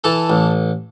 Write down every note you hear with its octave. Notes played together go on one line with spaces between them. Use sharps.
E3 A4 A5
A1